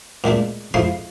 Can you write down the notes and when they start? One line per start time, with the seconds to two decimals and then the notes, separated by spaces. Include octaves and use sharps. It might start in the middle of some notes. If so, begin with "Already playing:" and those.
0.24 A#2 G#3 A3 D4
0.74 F2 G#2 E4 F4 C6